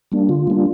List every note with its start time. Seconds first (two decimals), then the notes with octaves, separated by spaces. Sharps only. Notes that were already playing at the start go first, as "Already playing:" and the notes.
0.12 G3 A#3 D4
0.29 D3 F4
0.47 G3 A#3 D4